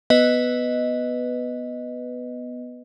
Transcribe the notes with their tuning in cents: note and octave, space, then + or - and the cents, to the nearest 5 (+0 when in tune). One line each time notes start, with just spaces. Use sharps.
B3 +0 B4 +10 D#5 +0